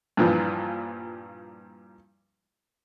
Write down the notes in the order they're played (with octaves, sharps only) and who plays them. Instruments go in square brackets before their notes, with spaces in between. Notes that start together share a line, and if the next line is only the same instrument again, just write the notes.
[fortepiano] G2 A#2 E3 F3